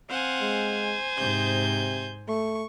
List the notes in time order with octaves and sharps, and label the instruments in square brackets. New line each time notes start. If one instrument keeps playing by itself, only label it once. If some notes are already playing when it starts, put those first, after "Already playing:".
[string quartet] C4 F5 F#5 [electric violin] C5 G#5
[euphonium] G#3
[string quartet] G#2 G6 [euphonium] C3
[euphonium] A3 [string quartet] C#6